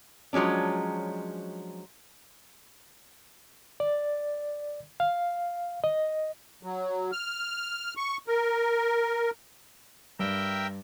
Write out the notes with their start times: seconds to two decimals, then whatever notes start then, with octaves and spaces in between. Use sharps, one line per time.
0.33 F3 F#3 G#3 C#4 D4
3.80 D5
5.00 F5
5.84 D#5
6.63 F#3
7.12 F6
7.97 C#6
8.28 A#4
10.19 G2 A#4 E5 G5